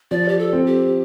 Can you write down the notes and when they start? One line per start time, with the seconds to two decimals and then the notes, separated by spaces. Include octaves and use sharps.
0.11 F3 D5
0.29 G4
0.39 A4
0.53 C4
0.66 G4